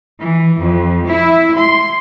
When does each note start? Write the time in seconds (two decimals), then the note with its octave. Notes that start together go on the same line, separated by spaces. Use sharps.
0.21 E3
0.61 F2
1.08 E4
1.57 C6